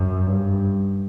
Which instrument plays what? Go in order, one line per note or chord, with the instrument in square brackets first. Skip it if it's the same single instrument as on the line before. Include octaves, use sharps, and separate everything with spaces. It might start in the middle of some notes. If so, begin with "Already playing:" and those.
Already playing: [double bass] F#2
G2